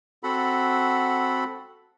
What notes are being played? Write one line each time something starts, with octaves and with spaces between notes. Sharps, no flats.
C4 F#4 A4 F#5 B5